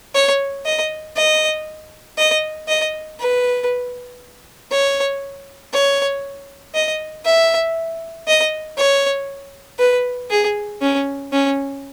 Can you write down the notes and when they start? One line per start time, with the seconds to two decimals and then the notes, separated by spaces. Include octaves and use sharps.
0.15 C#5
0.66 D#5
1.16 D#5
2.18 D#5
2.68 D#5
3.20 B4
4.72 C#5
5.73 C#5
6.75 D#5
7.26 E5
8.27 D#5
8.78 C#5
9.79 B4
10.30 G#4
10.82 C#4
11.33 C#4